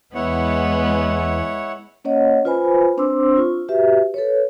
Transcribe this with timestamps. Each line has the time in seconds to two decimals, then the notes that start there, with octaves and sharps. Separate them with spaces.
0.15 E2 G#3 B3 E4 C#5 F#5
2.05 A#3 C#4 C#5 D#5 F#5
2.45 F4 B4 C5 G#5 B5
2.97 C4 D4 C5 C6 D6 E6
3.37 F4 C#6
3.69 F#4 G4 B4 E5
4.14 A4 B4 C#5